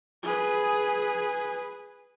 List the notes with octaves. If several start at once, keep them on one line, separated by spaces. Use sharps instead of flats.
G#4 B4